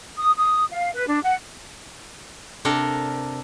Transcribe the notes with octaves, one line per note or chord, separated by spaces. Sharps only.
D#6
D#6
F5
B4
D4
F#5
C3 D4 A4 A#4